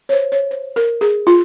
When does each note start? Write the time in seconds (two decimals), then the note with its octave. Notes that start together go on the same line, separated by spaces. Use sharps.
0.09 C#5
0.13 C5
0.32 C#5
0.51 C5
0.76 A#4
1.01 G#4
1.27 F4